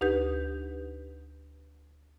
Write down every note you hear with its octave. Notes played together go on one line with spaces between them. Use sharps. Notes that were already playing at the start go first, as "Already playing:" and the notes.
D2 D#4 G4 B4 G6